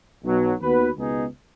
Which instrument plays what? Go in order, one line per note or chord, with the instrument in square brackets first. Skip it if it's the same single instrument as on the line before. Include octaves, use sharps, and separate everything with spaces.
[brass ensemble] B1 B2 F#3
D#2 D#3 B3 F#4 B4
C#2 B2 B3 D#4 G#4